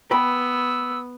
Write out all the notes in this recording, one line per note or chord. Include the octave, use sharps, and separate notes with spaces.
B3 B4 G5 B5 E6